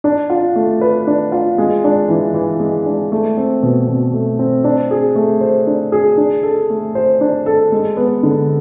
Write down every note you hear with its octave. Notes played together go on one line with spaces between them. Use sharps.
D4
F4
A3
B4
D4
F4
G#3
D4
E3
E3
G#3
D4
A3
C4
B2
B2
A3
C4
D4
G#4
A3
C5
D4
G#4
D4
A4
A3
C5
D4
A4
G#3
B3
D3